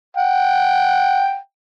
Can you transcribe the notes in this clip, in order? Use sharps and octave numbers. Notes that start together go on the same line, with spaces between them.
F#5 G5